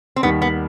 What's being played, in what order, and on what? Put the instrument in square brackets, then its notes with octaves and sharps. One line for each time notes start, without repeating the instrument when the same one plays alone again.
[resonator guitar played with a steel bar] C4
[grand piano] D#2 D#3 G3 [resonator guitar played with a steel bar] B3
[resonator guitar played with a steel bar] B3